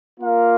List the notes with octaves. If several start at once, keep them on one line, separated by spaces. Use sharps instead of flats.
A#3 F4 A#4 F5